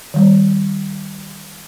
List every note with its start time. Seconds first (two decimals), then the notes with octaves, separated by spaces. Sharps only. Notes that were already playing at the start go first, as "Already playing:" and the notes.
0.14 D#3 G3